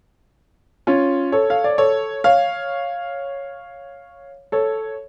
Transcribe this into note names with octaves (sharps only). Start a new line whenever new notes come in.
C#4 F4
A4 C#5
F5
D5
A4 C#5
C#5 F5
A4 C#5